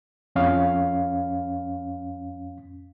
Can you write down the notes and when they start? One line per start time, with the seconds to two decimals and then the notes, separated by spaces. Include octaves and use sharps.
0.36 F2 C#4 F5